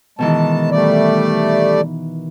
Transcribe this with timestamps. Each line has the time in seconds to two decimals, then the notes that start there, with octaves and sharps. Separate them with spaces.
0.19 B2 D#3 E3 G#3 A5
0.71 G3 A3 D5